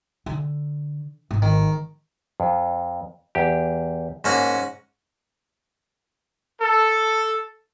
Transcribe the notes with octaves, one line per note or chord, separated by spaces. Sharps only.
D3
G#1
D#3
F2
E2 G4
G#2 A#3 C#4 F#4 A5
A4